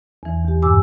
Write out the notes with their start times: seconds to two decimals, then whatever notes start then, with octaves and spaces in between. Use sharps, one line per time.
0.23 E2 E3
0.45 E2 G4
0.62 G2 B2 G4 G#5 D6 E6